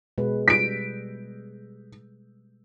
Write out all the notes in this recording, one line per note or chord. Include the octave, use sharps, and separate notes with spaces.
B2 G#3 B4
G3 B6 D7